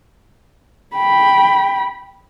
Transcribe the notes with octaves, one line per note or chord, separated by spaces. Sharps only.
G5 B5